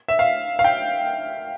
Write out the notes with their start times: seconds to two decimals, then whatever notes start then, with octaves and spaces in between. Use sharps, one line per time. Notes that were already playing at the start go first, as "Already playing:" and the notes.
0.08 E5
0.19 F5
0.59 F5
0.64 G5